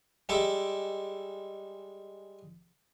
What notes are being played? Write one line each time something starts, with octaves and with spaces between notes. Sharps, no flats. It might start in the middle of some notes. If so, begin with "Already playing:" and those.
G3 G#3 A4 E5 D6